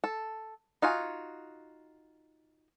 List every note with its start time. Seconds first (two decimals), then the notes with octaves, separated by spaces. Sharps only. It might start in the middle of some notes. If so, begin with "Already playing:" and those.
0.04 A4
0.82 D#4 F4 F#4 G#5